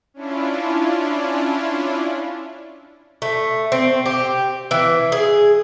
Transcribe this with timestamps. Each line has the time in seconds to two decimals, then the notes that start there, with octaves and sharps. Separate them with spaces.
0.14 C#4 D4 E4 F4
3.22 A3
3.72 C4
4.06 G4
4.71 E3
5.12 G#4